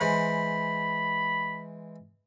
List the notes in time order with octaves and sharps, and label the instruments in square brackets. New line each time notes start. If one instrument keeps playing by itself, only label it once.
[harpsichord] E3 G#3 C5 [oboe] B5